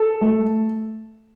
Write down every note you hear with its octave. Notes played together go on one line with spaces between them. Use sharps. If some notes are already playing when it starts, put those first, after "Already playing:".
Already playing: A4
A3